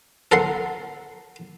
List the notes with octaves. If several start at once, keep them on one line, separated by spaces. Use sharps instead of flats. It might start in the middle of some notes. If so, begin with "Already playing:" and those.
A4 A#4 F#5 C6